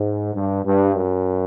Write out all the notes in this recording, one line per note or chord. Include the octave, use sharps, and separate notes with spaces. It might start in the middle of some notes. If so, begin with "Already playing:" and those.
Already playing: G#2
G2
G2
F#2